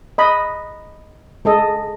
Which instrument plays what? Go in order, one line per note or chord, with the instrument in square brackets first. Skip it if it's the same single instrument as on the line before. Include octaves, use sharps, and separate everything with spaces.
[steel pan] D#5 B5
G#3 A4 D#5